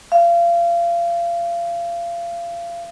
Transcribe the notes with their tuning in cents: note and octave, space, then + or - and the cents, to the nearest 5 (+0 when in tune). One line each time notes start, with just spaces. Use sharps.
F5 -30